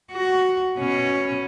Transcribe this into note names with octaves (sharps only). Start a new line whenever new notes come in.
F#4
B2 C#4